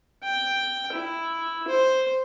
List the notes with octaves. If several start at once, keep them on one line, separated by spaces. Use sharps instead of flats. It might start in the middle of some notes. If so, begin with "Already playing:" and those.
G5
E4
C5